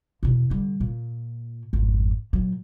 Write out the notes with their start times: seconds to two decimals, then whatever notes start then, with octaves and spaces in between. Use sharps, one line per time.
0.23 E2 B2
0.50 D3 G3
0.81 A#2
1.73 G#1 F2
2.33 A#2 F#3